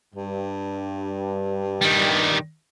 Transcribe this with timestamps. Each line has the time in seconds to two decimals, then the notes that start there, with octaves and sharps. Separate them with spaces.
0.15 G2
1.81 D#3 G3